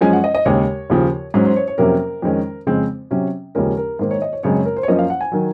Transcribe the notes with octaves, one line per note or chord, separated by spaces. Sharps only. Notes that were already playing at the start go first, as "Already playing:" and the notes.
F#2 F3 G#3 C#4 G#5
F#5
D#5
D#5
D#2 C#3 G#3 C#5
D#2 C#3 F3
G#2 F#3 C#4 C5
C5
C#5
C#5
F2 C3 F#3 A#3 C#4 A#4
F2 D#3 G#3 C#4
F2 C#3 G#3 C4
C3 F#3 C#4
D#2 C#3 F3 G#3 C#4 A#4
A#4
G#2 D#3 A#3 C5
C#5
D#5
C#5
F#2 C#3 G#3 C4 C#5
C#5
A#4
C5
C#5
F#2 F3 A#3 C#4 D#5
F5
F#5
G#5
D#3 F#3